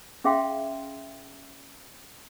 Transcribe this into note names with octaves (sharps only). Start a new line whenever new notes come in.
C#4 G#4 E5 F5 G5 C6